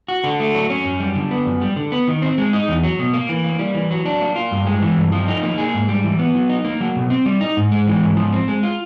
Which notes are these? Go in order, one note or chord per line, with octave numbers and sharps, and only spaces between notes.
F#4
D3
A3
F#3
C#4
F#2
G3
D3
B3
F#2
G3
D3
B3
D#3
C4
G#3
D#4
E2
F#3
B2
A#3
E3
A#3
G3
E3
F#3
D4
A#3
F4
G2
G#3
E3
G2
F3
D#4
A#3
G#4
G#2
G3
E3
B3
F#3
D#4
A#3
F#3
B2
C4
G3
D#4
G#2
G#3
E3
G#2
F3
C4
G#3
F4